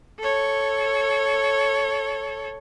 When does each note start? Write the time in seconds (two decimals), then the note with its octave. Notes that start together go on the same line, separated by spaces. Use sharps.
0.19 A4 C#5